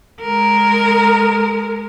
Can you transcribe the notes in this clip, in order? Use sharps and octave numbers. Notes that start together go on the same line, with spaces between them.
G#3 A#4